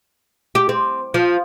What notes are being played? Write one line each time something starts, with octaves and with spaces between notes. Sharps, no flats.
G4
C4
F3